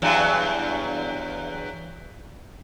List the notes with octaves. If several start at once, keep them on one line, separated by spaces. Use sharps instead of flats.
E2 G2 F#3